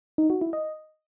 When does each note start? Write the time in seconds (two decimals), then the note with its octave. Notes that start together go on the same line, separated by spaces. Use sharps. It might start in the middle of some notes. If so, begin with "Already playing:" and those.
0.18 D#4
0.30 F#4
0.41 E4
0.53 D#5